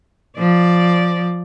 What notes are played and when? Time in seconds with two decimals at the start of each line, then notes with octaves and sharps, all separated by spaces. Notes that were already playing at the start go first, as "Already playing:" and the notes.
0.38 F3 D5